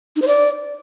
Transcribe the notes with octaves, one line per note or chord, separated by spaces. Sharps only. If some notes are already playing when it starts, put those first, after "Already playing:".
D#4
C5
D5